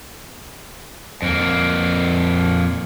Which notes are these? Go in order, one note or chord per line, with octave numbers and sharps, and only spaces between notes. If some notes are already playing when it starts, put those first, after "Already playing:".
F2 A#3